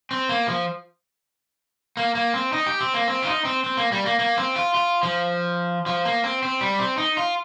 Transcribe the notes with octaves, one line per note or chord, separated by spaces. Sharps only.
C4
A#3
F3
A#3
A#3
C4
D#4
G4
C4
A#3
C4
F4
D#4
C4
C4
A#3
G3
A#3
A#3
C4
F4
F4
F3
F3
A#3
C4
C4
G3
C4
D#4
F4